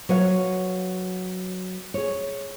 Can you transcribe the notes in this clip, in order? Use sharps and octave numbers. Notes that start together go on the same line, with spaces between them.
F#3 B4 C#5 F5
G#4 C#5